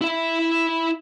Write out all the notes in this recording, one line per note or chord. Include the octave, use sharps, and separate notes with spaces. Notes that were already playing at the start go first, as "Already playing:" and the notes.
E4 E5